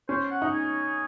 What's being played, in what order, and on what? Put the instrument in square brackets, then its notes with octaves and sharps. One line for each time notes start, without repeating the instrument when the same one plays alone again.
[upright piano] C#4 [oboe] C5
[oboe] F#5
[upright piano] D#4
[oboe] G#5